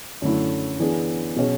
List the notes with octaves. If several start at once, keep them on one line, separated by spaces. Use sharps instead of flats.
F#2 D3 A3 E4
E3 B3 D4 G#4
B2 F#3 C#4 G#4